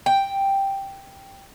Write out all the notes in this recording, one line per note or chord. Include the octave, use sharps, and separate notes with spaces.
G5